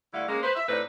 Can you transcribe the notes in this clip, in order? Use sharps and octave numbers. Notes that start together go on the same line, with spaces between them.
D3 G3 A3 E4 F5 F#5
G#3 A#3 C#4
B4 C5
E5
A2 C4 D4 D#4 B4